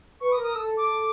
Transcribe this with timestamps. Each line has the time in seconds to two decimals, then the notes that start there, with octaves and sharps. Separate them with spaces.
0.21 B4 C#6
0.32 D#6
0.37 A#4
0.43 D#6
0.55 A4 E6
0.77 D6